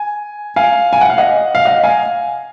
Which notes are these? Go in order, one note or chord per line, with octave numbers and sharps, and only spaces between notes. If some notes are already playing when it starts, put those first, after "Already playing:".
Already playing: G#5
F5 G#5
G#5
F#5
F5
D#5 F#5
F5
D#5 F#5
F5 G#5